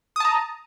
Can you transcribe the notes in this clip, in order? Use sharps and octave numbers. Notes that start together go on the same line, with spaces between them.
A5 A#5 D#6